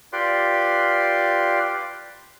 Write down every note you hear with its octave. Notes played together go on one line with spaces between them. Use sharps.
F4 G4 B4 D5 C6